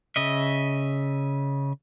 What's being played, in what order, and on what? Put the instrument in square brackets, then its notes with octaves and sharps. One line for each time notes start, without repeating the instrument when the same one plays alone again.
[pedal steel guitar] C#3 D#5 E5